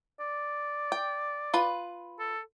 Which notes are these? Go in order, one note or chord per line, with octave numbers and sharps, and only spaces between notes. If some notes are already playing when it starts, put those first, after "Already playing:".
D5
G5
F4 B4
A4